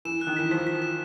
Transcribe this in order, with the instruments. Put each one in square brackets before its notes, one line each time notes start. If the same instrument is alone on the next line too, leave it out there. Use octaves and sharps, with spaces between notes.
[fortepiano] E3 [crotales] E7
[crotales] F#6
[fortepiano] D#3
[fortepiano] E3 [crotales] B6
[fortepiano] F3 [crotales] B6
[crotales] B6
E7